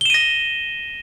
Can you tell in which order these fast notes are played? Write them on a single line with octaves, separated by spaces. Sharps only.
G7 E7 D#7 A#6